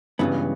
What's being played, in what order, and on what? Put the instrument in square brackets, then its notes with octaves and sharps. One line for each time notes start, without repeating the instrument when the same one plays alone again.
[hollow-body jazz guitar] C#2 C#3 E3 B3 [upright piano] G2 G3